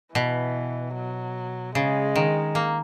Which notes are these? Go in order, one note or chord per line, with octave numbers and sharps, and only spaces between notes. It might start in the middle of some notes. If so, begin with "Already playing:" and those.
B2 E3
F#3
C#3 G#3
D#3
A#3